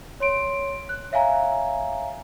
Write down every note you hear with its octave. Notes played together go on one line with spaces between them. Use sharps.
C#5 C6 D7
F#6
C#5 E5 F5 G#5 A#5